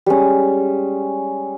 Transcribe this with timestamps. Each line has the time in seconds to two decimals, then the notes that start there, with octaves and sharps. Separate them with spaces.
0.06 G3 G#3 C#4